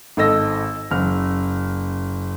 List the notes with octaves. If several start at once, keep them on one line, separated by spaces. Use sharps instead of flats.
G#1 A4 D#5 E6 A#6
F#1 F6